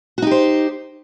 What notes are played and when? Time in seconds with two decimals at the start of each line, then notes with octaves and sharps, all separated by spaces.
0.18 F#4
0.22 D#4
0.27 G4
0.31 C5